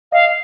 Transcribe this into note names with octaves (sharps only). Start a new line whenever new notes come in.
D#5 F5